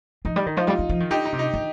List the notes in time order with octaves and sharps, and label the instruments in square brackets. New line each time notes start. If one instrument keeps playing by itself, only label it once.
[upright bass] F3 [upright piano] D#4
[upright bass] G3
D#3
[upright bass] F3 [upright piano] D#4
[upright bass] G3 [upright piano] F4
[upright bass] G3
F3
D#3
[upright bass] D3 [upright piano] D#4 G4
[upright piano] D#4
[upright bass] C3
[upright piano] D#4
[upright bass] D#3